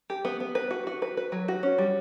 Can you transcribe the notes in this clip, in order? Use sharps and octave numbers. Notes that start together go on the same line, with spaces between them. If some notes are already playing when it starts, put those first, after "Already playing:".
G4
B3
B3
B4
F#4
F#4
B4
B4
F#3
F#4
C#4
G3